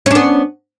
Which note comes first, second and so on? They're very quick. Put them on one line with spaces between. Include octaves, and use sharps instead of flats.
C#4 D4 B3